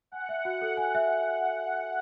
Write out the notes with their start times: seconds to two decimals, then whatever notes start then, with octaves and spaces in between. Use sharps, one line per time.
0.12 F#5 G#5
0.29 E5
0.45 F#4
0.62 A4
0.77 G#5
0.95 E5